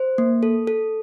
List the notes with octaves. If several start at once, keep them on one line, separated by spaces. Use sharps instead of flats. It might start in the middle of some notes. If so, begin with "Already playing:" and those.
Already playing: C5
A#3
A4
A4